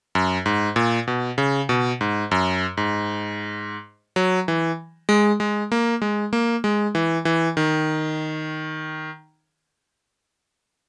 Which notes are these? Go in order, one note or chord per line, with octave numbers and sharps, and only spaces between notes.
F#2
G#2
A#2
B2
C#3
B2
G#2
F#2
G#2
F#3
E3
G#3
G#3
A#3
G#3
A#3
G#3
E3
E3
D#3